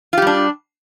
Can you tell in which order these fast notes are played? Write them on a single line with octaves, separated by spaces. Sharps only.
F4 G4 G3 D4